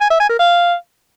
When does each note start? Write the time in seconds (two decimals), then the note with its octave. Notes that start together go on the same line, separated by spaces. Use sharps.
0.01 G#5
0.10 E5
0.20 G#5
0.29 A#4
0.39 F5